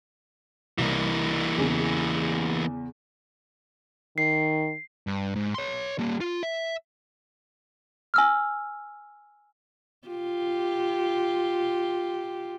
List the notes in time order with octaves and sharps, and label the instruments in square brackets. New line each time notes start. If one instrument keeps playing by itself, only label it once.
[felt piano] C2 [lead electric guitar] E3 A#3
[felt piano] E2 C#3
[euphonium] D#3 [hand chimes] C7
[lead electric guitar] G2
G#2
C#5 C6
G3 A#3
F4
E5
[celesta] G#5 E6 F6
[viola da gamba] F4 G4